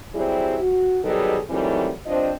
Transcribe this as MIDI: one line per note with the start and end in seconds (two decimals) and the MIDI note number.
0.14 0.57 54
0.14 0.57 55
0.14 0.57 60
0.14 0.57 64
0.14 0.57 67
0.14 0.57 68
0.61 0.98 66
1.05 1.38 47
1.05 1.38 51
1.05 1.38 54
1.05 1.38 55
1.05 1.38 68
1.05 1.38 69
1.50 1.89 51
1.50 1.89 52
1.50 1.89 54
1.50 1.89 55
1.50 1.89 57
1.50 1.89 60
2.06 2.31 43
2.06 2.31 53
2.06 2.31 60
2.06 2.31 62
2.06 2.31 72
2.06 2.31 75